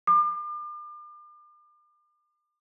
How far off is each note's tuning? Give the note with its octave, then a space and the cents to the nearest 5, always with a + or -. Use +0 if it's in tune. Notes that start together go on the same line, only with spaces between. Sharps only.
D6 +40